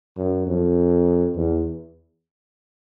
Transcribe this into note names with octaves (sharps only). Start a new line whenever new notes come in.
F#2
F2
E2